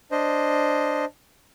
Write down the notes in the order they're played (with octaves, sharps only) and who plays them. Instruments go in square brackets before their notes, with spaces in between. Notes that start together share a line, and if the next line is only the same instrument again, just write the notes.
[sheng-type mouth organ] D4 C5 D#5